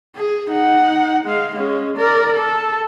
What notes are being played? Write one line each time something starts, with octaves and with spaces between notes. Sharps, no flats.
G#4
D#4 F#5
G#3 F5
G#3 C#4
A#4 D5
A4